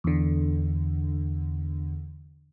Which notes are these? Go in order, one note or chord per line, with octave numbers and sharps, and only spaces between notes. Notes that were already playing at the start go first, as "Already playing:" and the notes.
E2 D3